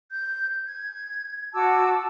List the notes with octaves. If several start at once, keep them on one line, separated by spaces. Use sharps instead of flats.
G6
G#6
F#4 A5 D6 E6